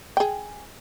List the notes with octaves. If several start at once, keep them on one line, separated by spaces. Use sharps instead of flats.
G#4 G5